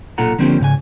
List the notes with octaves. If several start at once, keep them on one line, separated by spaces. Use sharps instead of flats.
B1 A#2 F4 A4 F#5 A#5
D3 F3 A#3 C4 C#4 G4
G#2 C#3 F5 G#5